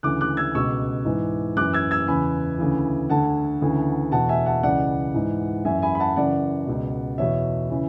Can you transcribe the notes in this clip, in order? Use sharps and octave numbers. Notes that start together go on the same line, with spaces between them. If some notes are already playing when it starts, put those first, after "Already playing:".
D2 C#3 E3 D6 F#6
D6 F#6
E6 G#6
C#2 B2 C#6 E6
G#2 E3
F#2 E3 D6 F#6
E6 G#6
E6 G#6
E2 C#3 E3 G#5 B5
D2 C#3 E3
D2 D3 F#5 A5
D2 C#3 E3
E2 B2 F#5 A5
E5 G#5
F#5 A5
C#2 C#3 E3 D5 F#5
G#2 E3
F#2 E3 E5 G#5
G#5 B5
B5
F#5 A5
F#2 C#3 E3 D5 F#5
C#2 B2
E2 B2 C#5 E5
C#3 E3